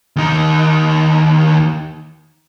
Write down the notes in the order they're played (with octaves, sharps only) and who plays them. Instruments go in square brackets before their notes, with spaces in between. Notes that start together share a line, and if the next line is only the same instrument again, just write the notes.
[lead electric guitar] D#2 D#4